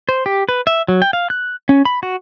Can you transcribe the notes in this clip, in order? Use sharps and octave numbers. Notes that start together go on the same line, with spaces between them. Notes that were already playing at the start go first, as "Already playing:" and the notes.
C5
G4
B4
E5
F#3
G5
F5
F#6
C#4
B5
F#4